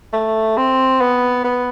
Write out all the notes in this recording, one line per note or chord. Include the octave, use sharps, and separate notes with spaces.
A3
C4
B3
B3